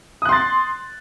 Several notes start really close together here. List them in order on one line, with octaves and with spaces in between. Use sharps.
D#6 F#6 C6 A6